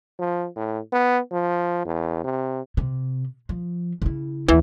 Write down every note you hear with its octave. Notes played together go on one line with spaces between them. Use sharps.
F3
A2
B3
F3
E2
C3
C3
F3
C#3 E4
D#2 E3 C4